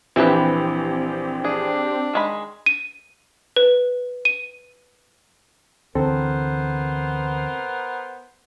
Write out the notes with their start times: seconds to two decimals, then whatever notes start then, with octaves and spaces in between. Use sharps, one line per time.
0.16 A#1 E3 C4 E4 G4 B4
1.45 D4 G#4
2.13 D#3 G#3 B5
2.66 D#7
3.56 B4
4.25 D#7
5.95 D2 D3 E3 B3 C4 A4 A#4 C5